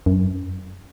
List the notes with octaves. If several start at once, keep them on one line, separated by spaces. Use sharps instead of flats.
F#2